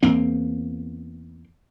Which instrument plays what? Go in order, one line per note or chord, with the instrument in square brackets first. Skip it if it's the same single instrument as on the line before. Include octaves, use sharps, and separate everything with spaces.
[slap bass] E2 A#3 C4